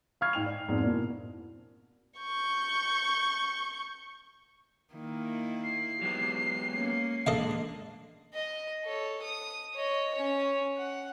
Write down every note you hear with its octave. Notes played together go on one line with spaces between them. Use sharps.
F5 B5 C#6 F6 G#6 C7
G#2 D#4 G5 F7
D5
F2 G#2 B3 C4 D4
B2 A#3 D4 E4
C#6 G6
D#3 A#3 E4
C7
F#3 G#3 B3 G4
A#3 C#4
G#3 A#3 D4 A4 D#5 F5
D#5
A4 C#5
D#6
C#5 D#5
C#4 C#5
F#5